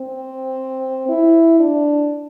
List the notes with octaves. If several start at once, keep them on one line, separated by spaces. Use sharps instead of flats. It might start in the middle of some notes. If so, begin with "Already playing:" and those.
Already playing: C4
E4
D4